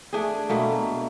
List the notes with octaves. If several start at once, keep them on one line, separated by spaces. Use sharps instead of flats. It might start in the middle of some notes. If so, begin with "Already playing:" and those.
A3 D4 G#4
B2 A3 A#3